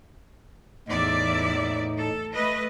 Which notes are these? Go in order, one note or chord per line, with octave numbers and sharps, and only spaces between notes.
E2 A2 D#4 D5 E5
A4
A3 B4 D#5